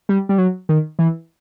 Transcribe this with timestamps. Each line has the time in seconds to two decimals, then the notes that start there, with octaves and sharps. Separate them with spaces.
0.09 G3
0.29 G3
0.38 F#3
0.69 D#3
0.99 E3